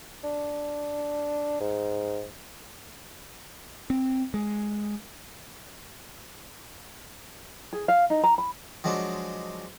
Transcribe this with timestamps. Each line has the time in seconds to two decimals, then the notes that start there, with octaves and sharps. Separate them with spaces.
0.24 D4
1.60 G#2
3.90 C4
4.34 G#3
7.73 G#4
7.88 F5
8.10 D#4
8.24 A#5
8.38 B5
8.84 F3 F#3 G#3 D4